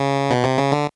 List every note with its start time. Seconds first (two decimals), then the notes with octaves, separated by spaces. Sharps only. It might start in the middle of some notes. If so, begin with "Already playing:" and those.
Already playing: C#3
0.30 B2
0.44 C3
0.58 C#3
0.72 D3